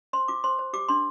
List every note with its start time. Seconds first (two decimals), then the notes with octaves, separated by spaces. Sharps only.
0.13 C5 C6
0.28 F4 D6
0.44 C5 C6
0.59 C5
0.73 G4 D6
0.89 D4 C6